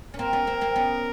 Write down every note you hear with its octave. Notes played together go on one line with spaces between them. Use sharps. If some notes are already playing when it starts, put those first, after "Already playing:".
C#4
A#3 C4 A#4
B3 C#4
A#3 C4
A#3 C4
B3 C#4